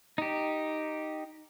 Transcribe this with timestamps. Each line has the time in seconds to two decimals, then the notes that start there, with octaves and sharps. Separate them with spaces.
0.18 D#4 G4